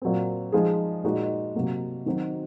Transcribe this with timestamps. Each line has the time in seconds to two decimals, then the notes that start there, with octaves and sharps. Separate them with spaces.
0.02 A#2 F#3 C4
0.52 F3 G#3 D#4 G#4
1.04 A#2 G#3 D#4 F#4
1.56 C3 F#3 A#3
2.06 D#3 F#3 C4 D#4 F#4